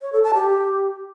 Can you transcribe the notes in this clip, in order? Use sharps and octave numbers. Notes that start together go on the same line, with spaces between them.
C#5
A4
A5
G4